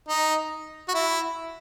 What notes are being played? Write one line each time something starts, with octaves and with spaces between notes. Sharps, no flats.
D#4
F#4
E4